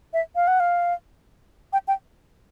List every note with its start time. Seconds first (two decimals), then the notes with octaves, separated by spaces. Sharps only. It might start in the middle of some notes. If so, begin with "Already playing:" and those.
0.13 E5
0.36 F5
0.48 F#5
0.60 F5
1.73 G5
1.88 G5